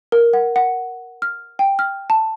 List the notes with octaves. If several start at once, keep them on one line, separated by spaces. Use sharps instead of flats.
A#4
F#5
F#5
F6
G5
F6
A5